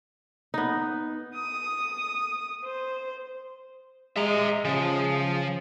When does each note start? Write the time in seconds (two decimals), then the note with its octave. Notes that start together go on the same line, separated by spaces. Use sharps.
0.54 B3 D#4
1.36 D#6
2.65 C5
4.17 G#3 E5 A#5
4.65 C#3 F3 G#4